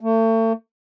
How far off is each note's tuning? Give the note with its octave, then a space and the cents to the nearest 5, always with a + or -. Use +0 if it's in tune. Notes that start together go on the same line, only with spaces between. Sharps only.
A3 +40